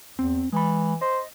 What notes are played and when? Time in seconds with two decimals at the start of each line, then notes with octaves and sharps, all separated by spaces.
0.19 E2 C4
0.52 E3 G#3 B5
1.01 C5 D#5